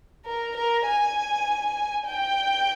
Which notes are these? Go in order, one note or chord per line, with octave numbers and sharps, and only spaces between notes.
A#4
A#4
G#5
G5